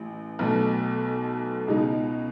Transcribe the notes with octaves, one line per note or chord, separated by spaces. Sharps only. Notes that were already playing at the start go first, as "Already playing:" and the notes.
Already playing: A1 E3
B1 B2 A3
C#2 B2 G#3 D#4